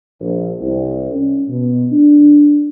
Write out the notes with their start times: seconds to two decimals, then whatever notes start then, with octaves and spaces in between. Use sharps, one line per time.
0.21 A#1
0.60 C2
1.12 C#4
1.48 B2
1.92 D4